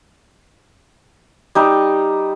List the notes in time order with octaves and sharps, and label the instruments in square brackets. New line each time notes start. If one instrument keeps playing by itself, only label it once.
[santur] G3 D#4